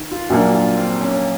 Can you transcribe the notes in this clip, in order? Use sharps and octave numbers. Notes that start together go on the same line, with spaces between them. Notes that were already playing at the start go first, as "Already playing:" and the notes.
Already playing: D#3
F4
A#1 A#2 F#3 A#3 D4 F#4
F4
C4
C#4